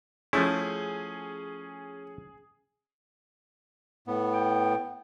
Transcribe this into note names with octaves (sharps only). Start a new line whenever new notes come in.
F3 A3 C#4 E4 G#4
A2 B3
G5